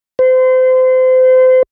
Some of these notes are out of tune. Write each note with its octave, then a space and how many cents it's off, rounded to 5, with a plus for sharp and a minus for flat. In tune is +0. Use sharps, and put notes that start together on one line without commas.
C5 -30